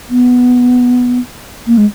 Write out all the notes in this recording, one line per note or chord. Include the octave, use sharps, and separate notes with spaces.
B3
A#3
G#3